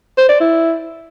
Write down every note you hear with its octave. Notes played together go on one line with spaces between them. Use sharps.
C5
D5
E4